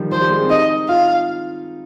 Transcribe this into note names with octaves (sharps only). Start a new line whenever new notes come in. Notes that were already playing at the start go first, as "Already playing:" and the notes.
Already playing: D#3 F3 G3
F3 C5
G3
G#3
C4
D#4 D#5
F4 F5